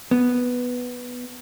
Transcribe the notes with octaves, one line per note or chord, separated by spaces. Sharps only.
B3